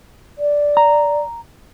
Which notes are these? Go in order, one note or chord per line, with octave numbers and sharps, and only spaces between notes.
D5
A#5